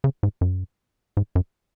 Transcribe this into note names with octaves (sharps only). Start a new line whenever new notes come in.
C#3
G#2
F#2
G#2
F#2